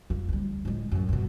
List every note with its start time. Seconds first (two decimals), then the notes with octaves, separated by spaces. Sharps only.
0.10 F2 A#3
0.29 D2 G3
0.65 A2 G#3
0.92 F#2 A2
1.09 G2 B2